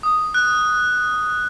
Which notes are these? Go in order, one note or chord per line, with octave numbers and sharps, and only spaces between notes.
D#6
F#6